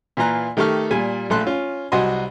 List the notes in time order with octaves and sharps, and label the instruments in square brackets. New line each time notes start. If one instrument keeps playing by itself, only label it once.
[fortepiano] A#2 E3 F4 A#5 F#6
D#3 A3 G4 A4 C#6 F6
A#2 G3 G#5
A#1 A3 A4 C6 F#6
C#4 F4
C2 F#3 F#4 D#5 G#5 C6